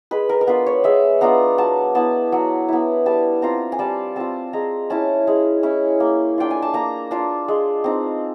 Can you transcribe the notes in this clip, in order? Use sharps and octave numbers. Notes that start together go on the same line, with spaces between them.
G#3 B4
A#4
A#4
B3 D4 F4 B4
C#5
G#3 E5
B3 D4 F4 A#5
F#3 A5
B3 E4 A5
F#3
B3 E4
G3 A5
C4 F4 A#5
G#5
G3 A5
C4 F4 A5
G#3 A#5
C#4 E4 A5
G#3
C#4 E4
A#3
D4 F4 G5
G#5
A5
A#3 A#5
D4 F4 A5
G#3
C4 D#4